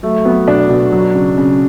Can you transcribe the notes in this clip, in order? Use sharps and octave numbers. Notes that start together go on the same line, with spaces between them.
F#3 A3
F#3 B3
B2 D4
B2
F#3
C#3
C#3